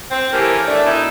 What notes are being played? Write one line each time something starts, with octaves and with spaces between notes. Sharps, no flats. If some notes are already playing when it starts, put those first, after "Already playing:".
C4
E3 A3 A#3 C#4 G4 A#4
A3 D4
B2 D#4 E4